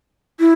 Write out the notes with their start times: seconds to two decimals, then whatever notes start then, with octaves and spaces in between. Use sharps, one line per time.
0.40 E4